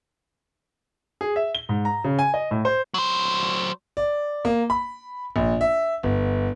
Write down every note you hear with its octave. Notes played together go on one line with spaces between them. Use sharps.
G#4
E5
G7
G#2
A#5
C#3
G#5
D#5
A2
C5
F#3 C5
D5
A#3
B5
A#1
E5
G1